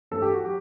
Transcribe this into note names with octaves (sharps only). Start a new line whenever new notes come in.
G2 E3 A3 A4
G4
F#4
F#3 G4